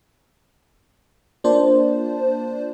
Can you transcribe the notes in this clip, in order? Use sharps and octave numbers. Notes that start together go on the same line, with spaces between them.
A#3 D4 F4 C5 D5 A5